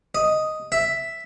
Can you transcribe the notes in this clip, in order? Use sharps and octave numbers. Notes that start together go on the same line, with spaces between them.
D#5
E5